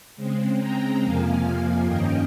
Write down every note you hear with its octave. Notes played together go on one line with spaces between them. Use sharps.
C#3 G#3 C4
G5 A#5
F2 C3 F3 A#3 F5 G#5
G2 D#3 A#3 C#4 D#5 G5